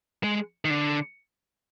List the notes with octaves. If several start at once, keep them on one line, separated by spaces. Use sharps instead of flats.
G#3
D#3
D3